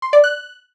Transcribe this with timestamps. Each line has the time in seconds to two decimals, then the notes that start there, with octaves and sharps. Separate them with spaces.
0.02 C6
0.13 D5
0.24 F#6